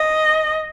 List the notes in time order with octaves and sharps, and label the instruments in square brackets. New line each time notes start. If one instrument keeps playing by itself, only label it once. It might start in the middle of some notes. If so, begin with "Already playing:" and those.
Already playing: [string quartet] D#5